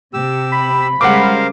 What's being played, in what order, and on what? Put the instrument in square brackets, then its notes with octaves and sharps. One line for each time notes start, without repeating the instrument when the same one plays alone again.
[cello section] C3 [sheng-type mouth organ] G4 E6
[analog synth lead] B5
[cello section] C#3 G3 G#3 [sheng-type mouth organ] A#4 C5 F5 [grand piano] F#5 D6